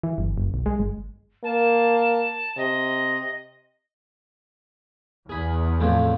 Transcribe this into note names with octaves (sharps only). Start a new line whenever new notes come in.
E3
G1
F#1
B1
G#3
G1
A#3 A5
C3 D#5
E2 G#4 B5
F2 A2 F3